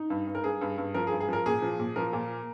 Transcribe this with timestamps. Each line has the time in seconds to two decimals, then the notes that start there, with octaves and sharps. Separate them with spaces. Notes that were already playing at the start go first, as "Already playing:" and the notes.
Already playing: D#4
0.10 G2
0.27 G2
0.35 A#4
0.44 G2 G#4
0.61 G2
0.78 G2
0.94 F3 A#4
1.07 G#4
1.12 G2
1.20 G#4
1.29 F3 A#4
1.46 A#2 G#4
1.62 F3
1.80 A#2
1.96 F3 A#4
2.13 A#2